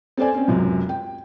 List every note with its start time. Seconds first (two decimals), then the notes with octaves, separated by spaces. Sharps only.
0.17 C4 A4 C5 D5 G#5
0.34 C4 C#4
0.48 C#2 F#2 C3
0.89 G5